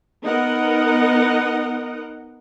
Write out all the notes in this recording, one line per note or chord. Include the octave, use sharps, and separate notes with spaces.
B3 D#4 A#4 D#5 F#5